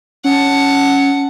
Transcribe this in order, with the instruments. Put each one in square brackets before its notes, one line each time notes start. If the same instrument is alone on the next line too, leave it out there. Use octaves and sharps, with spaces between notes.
[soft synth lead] C#4 [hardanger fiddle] F#5 A5